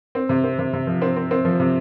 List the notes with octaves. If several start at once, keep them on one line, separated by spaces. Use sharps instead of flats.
C4
C3
C4
C3
C3
F3
C4
C4
C4
F3
C3